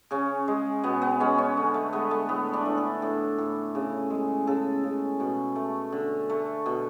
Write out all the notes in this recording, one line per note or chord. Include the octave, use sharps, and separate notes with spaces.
C#3 C#4
G#3
B2 B3
B3
G#3 C#4
C#4
D3
A3
G#3 B3
A3
A2 B3
D4
A2
A4
A2
A2
C#3
G#3
C#3 A4
C#3
B2
A3
D3
A3
B2